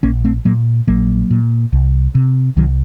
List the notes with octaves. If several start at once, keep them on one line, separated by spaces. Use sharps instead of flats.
A#1 A#3 C#4
A3 C4
A#2 F#3 A#3
A#1 F#3 A#3
A#2
C2
C3
C2 D#3 F#3